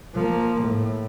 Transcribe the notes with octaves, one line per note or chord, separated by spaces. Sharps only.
F3 A#3
A2